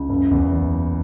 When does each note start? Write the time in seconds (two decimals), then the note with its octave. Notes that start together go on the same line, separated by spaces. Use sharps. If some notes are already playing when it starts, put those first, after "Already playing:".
Already playing: C#2
0.09 F#1
0.31 E2